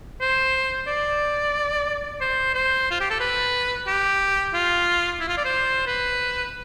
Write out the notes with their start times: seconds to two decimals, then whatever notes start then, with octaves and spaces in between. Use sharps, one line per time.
0.21 C5
0.87 D5
2.21 C5
2.54 C5
2.91 F4
3.00 G4
3.10 A4
3.20 B4
3.87 G4
4.54 F4
5.20 E4
5.28 F4
5.37 D5
5.45 C5
5.87 B4